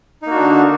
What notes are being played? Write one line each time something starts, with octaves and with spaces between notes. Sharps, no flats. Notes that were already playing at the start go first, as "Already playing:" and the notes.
D3 A#3 D4 D#4 F#4